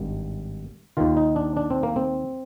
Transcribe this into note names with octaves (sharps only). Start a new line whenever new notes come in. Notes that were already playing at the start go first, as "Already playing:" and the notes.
Already playing: G#1 G2 D#3
D#2 D#3 F4
D#4
D4
D4
C4
A#3
C4